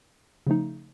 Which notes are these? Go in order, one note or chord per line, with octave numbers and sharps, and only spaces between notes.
C#3 F3 A3 D#4